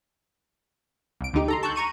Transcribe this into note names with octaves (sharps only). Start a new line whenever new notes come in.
C2 D7
D2 D3 D#4 G4
A4 A#5 C6
A5 C#6 E6 F#6 G6
A#5 C#6 D#7